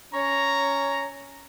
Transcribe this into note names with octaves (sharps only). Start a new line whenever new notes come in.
C#4 C#5 A#5